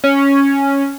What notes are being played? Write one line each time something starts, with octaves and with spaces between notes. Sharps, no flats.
C#4